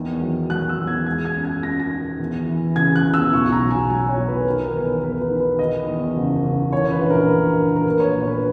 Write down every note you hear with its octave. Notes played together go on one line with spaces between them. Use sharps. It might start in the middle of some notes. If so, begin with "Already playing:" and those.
Already playing: E2 D#3
F#3
F#3 F#6
E6
E2
G#6
G#3 G#6
G#6
F#2
G#6
F#2 A#6
A#6
D#3
E2
E3
C#3 G#6
F#6
E2
E6
B1 C#6
A#5
F#3
G#5
F#3 G#5
C#5
B1
B4
D#3 A#4
B4
E2
A#4
E2 B4
B4
D#3
B4
D#3 D#5
E2
F#1
F#1
E3 C#5
B4
A#1
A#4
A#1
A#1
A#4
A#2 B4
C#5
A#1
C#5
B4